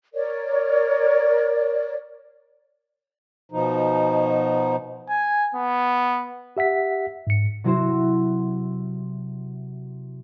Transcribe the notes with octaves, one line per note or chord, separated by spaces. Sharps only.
A#4 C#5 D5
B2 F3 D#4
G#5
B3
G4 E5 F#5 B6
G#2 C#7
C3 F#3 C4 E4 F#4 C5